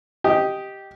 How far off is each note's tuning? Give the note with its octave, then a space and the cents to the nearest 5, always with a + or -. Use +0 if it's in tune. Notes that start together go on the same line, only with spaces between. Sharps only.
G4 -5 D#5 +0